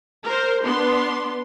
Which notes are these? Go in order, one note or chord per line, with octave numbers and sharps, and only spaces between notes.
A#4 C5
B3 D4 C6